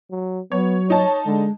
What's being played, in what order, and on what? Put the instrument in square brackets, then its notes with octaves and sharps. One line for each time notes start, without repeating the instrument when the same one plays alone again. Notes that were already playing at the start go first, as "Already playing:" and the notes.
[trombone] F#3
[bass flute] F#3 [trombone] B3 [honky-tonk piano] C#5
[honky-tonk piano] D#4 A5 [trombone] C#5
[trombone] D3 [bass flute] G#3